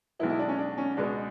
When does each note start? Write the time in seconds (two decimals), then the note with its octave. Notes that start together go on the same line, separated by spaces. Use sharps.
0.19 B1 B2 G#3 B3 E4
0.30 E4
0.39 D4
0.49 C#4
0.58 D4
0.78 C#4
0.97 C#2 B2 G#3 B3 D4